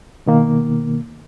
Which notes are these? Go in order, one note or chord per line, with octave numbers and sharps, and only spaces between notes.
B2 D#3 A#3